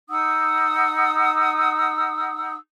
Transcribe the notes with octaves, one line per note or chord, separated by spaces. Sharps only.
D#4 F#5 D#6 E6